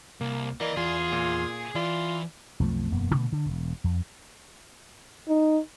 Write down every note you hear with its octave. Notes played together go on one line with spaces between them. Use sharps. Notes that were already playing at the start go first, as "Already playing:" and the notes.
C2 A#3
E3 A#3 D5 D#5
E2 F4 G#4
A#2
E3 F4 D5
B1 F2 F3 A3
E1 F#2 A#3 B3
A#2 D3 A3 B3
D3
E1
F2
D#4